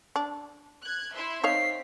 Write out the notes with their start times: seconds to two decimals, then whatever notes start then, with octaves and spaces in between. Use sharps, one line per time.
0.16 D4
0.82 F#6 G#6
1.14 E4 E5 C6
1.44 C4 D#4 C#5 F5 B6 C7